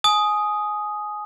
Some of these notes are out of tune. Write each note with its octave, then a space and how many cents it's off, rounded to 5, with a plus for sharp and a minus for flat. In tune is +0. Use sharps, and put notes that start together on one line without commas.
G#5 +20 D#6 +0